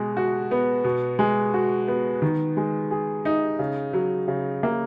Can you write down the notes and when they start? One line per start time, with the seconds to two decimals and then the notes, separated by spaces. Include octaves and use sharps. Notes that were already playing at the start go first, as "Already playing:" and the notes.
Already playing: B2 G#3
0.17 F#4
0.51 B3
0.84 B2
1.19 G#3
1.54 F#4
1.88 B3
2.22 D#3
2.57 G#3
2.91 G#4
3.25 D#4
3.59 C#3
3.93 F#3
4.28 C#3
4.63 A#3